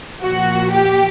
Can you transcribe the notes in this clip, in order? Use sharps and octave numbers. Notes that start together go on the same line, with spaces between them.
A#2 F3 F#4
G4